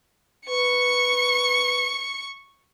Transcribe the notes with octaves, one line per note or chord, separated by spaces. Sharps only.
B4 C#6 C#7